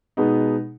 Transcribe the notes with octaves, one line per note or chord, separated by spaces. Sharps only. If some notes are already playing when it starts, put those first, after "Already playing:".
B2 G#3 B3 D#4